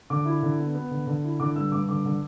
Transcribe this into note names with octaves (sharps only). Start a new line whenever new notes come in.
D3 D6
E4
D3
B3
B3
D3
D3
E4
D3 D6
G2 E6
G2 D6
D3 D6
D3